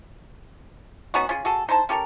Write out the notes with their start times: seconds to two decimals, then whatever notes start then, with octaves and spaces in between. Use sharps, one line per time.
1.14 B3 C#4 D#4 F#4
1.29 C#4 F4 G#4
1.45 F#4 G#4 A4
1.69 D#4 E4 C5 A5
1.89 C#4 G4 A4 A#4